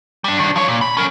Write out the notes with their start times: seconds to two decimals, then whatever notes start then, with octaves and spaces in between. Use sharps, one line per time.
0.24 G3 D4
0.39 D#3 D4
0.56 F3 C#5
0.68 A#2
0.81 B5
0.97 C#4 A#4